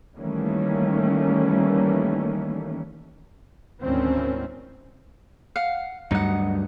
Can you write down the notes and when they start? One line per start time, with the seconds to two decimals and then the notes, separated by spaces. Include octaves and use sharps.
0.18 D#3 E3 G3 A3 A#3 C#4
3.82 D2 G#2 D#3 E3 C4 C#4
5.56 F5 F#5
6.11 D2 G2 F#3 D#4 F#5